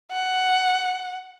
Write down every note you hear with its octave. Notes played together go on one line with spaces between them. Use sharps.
F#5